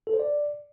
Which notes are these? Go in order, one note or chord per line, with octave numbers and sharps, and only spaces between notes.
A4
C5
D5